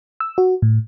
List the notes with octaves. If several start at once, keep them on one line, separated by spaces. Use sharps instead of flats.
E6
F#4
A2